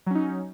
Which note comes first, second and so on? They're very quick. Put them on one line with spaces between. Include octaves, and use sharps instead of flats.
F#3 C#4 D#4